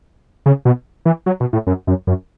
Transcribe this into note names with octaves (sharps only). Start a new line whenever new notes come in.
C#3
B2
E3
F#3
B2
A2
F#2
F#2
F#2